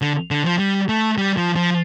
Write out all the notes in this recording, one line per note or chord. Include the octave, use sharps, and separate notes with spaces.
D3
D3
F3
G3
A3
G3
F3
F3